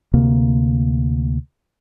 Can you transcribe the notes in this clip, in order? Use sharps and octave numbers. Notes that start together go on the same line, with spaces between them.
D2 C3 A#3